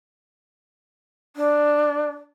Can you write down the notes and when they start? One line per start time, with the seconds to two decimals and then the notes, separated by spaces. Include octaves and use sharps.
1.36 D4